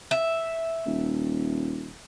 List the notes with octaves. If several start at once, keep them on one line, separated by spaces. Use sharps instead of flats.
E5
D#1